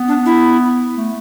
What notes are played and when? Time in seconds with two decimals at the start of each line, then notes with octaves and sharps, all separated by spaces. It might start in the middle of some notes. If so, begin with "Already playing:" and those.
Already playing: B3
0.08 D4
0.26 E4
0.96 A3